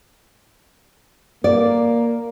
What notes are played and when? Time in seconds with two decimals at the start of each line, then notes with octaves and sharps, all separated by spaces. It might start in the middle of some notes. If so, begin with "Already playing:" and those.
1.44 A#3 D5